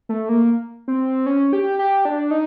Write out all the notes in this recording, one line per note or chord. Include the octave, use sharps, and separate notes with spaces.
A3
A#3
C4
C#4
G4
G4
D4
D#4